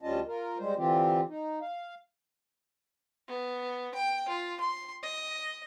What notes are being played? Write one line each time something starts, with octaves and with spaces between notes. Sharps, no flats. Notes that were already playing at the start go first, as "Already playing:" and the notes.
D2 G3 C#4 F4 D#5 A5
F4 A#4
G3 G#3 C5
D3 E3 C4 F4 G4
D#4
F5
B3
G5
F4
C6
D#5